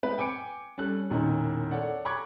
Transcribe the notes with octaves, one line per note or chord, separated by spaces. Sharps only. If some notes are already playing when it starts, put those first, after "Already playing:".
G#3 B3 C4 B4
G5 G#5 D6 C#7 D7
G3 C#4 A4 F#6
E1 A#2 D#3 C#4 A#5
A4 C#5 D5 F#5
A#5 B5 C#6 D6 F#6 G#6